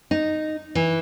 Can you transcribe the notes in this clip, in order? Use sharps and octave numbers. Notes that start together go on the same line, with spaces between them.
D#4
E3